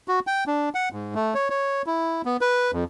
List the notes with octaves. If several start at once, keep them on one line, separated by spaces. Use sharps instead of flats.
F#4
G5
D4
F#5
G#2
A3
C#5
C#5
E4
B3
B4
F2